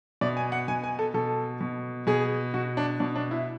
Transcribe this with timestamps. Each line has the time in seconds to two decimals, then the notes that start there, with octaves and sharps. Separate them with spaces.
0.21 B2 D5
0.37 G#5
0.52 F#5
0.68 B2 G#5
0.84 G#5
0.99 A4
1.14 B2 A4
1.61 B2
2.07 B2 G#4
2.54 B2 F#4
2.77 D4
3.00 B2 D4
3.15 D4
3.31 E4